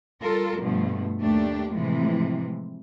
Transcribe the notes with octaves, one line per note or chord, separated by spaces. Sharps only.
G3 F4 A4 A#4
G2 B2 F3 A3
D#2 A3 D4 G4
A2 C3 E3 F3 G#3 A3